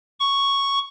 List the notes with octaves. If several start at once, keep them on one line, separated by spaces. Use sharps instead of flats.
C#6